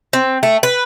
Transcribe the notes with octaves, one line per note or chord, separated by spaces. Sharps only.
C4
A3
B4